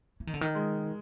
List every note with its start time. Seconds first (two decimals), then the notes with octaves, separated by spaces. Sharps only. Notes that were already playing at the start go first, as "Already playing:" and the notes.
0.20 E3
0.27 D#3
0.34 D3
0.41 D#3
0.55 G#3